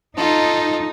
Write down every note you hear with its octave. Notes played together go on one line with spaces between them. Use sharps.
D#4 F4 A4